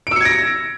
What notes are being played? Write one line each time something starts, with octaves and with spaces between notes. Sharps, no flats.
E6 G#6 A#6 C#7 D7